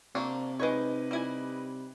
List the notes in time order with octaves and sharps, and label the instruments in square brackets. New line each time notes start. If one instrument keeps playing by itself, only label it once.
[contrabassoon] C3 [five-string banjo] A#3 C4 D4 [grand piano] C#6
[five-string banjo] G#3 C#5 [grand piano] D#4 B4 D#5
[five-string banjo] G3 E4 G#5